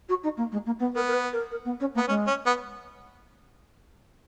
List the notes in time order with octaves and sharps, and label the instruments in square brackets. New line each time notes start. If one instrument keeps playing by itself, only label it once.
[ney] F#4
D#4
A#3
G#3
A#3
B3
[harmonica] B3 [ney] A#4
[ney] A#4
B4
A#4
A#4
B3
C#4
A#3
[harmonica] B3
[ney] G#3 [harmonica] C#4
[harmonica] C#4
B3